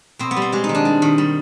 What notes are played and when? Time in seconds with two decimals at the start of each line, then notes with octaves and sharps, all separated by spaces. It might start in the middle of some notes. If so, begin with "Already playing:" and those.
0.19 B2 C4
0.31 B3
0.36 G3
0.42 C4
0.52 G#3 G4
0.64 D#4
0.69 D#3
0.75 D4
0.85 G3
1.02 D#3
1.18 G3